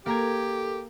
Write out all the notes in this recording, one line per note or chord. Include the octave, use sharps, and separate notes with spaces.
A#3 G4 A4 A#4 A#5 G#6